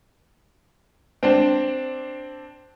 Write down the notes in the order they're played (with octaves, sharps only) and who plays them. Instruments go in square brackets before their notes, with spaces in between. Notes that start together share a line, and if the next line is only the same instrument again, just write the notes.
[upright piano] C4 D4